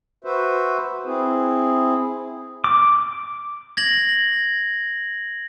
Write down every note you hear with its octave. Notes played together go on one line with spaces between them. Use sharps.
F#4 B4 C5 E5
C4 E4 G#4
D6
G#6 A#6 F#7